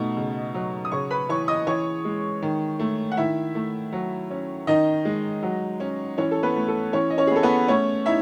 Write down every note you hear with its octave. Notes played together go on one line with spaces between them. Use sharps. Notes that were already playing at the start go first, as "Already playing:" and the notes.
Already playing: B2 A3 D#4
C#3
F#3
D#6
C#3 C#5 C#6
B4 B5
E3 C#5 C#6
D#5 D#6
E3 C#5 C#6
G#3
D#3
A3
F#5
D#3 E4 E5
A3
F#3
C#4
D#3 D#4 D#5
G#3
F#3
C#4
E3 C#4 C#5
A4
B3 B4
A3
A4
E3 C#4 C#5
D#5
C#4 C#5
G#4
B3
A4
B3 B4
A3 C#4 C#5
D#4 E4 E5